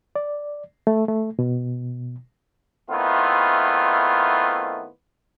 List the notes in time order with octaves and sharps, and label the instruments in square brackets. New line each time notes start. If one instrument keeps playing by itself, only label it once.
[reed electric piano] D5
A3
A3
B2
[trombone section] D#3 A3 B3 C4 E4 F4